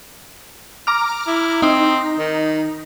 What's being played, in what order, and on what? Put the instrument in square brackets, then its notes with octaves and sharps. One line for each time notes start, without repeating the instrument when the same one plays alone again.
[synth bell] A#5 D6 F6
[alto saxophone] E4
[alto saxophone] C4 [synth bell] D#4
[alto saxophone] D#3